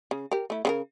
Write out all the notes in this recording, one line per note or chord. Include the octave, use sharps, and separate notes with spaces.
C#3
G4 A#4
A3 E4
C#3 C4 A#4